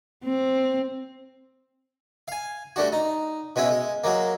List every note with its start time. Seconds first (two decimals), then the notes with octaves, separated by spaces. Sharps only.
0.24 C4
2.28 F5 G#5
2.76 G3 A3 D4 F#4
2.93 D#4
3.56 B2 G#3 C#4 E4
3.71 G#3
4.04 F#3 G#3 A#3